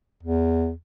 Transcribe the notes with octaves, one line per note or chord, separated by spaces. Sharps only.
E2